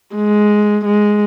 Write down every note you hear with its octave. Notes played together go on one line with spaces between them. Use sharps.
G#3
G#3